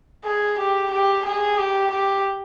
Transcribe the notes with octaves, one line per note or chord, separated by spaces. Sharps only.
G#4
G4
G4
G#4
G4
G4